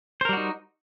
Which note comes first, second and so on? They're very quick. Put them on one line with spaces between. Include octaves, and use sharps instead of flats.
C5 A#4 G3 F#4 D#4